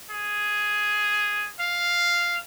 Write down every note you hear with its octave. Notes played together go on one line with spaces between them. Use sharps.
G#4
F5